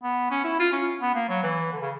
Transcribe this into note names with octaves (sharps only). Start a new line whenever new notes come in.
B3
C#4
E4
F4
C#4
B3
A#3
F#3
E3
D3
C#3